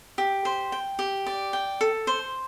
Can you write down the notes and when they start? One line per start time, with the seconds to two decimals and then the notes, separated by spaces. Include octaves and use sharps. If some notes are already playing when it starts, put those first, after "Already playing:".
0.18 G4
0.45 C5
0.72 G5
0.99 G4
1.26 D5
1.53 G5
1.81 A4
2.07 C5